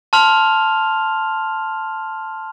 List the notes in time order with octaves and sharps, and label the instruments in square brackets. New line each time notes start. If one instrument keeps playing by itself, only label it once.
[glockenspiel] A5 C6 F6 F7